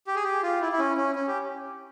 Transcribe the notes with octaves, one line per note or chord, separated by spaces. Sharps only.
G4
G#4
G4
F4
E4
E4
C#4
C#4
C#4
G4